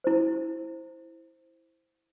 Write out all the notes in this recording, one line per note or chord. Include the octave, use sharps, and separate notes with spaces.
E4 C5